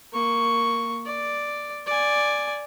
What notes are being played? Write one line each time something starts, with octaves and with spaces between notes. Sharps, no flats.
A#3 C#6
D5
D5 G#5